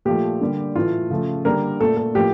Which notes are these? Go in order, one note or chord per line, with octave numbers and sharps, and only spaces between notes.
A#2 F3 A3 G4
D3 G3 A#3
A2 E3 A3 F4
C#3 F3 A3
D3 G3 A#3 A#4
A#2 A3 A4
A4
A2 F3 A#3 G4